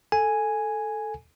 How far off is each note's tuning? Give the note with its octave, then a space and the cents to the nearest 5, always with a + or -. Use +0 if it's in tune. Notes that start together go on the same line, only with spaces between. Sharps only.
A4 +0 G#5 +0